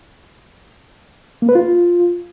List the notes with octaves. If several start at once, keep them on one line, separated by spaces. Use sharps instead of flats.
A#3
B4
F4